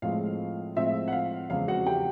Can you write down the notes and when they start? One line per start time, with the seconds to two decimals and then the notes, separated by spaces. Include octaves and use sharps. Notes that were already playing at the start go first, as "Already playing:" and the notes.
0.02 A2 F3 G#3 C4 F4 F5
0.76 A2 F3 G#3 C4 F4 E5
1.08 F#5
1.12 F5
1.50 E2 C#3 F3 G#3 C4 F5
1.68 F#4 F#5
1.86 G4 G5